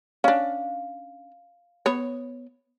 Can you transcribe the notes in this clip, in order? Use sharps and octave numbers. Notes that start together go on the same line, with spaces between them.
C#4 D4 F5
B3 C#5